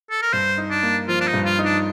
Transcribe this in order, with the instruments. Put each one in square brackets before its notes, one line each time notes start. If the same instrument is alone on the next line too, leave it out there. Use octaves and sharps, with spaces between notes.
[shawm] A4
A#4
[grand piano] G2 [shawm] C5
[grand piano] D#4
[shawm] D4
[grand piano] A#3
[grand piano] F3 [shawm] F4
[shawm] D4
D#4
[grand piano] G2
[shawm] F4
[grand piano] D#4
[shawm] D4